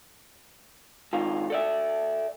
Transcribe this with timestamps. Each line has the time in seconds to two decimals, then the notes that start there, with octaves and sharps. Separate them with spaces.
1.13 G#2 D#3 F4
1.50 A4 D5 E5